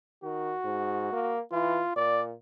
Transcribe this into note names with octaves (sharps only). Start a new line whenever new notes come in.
D#3 F#4
G#2
A#3
E3 F4
A#2 D5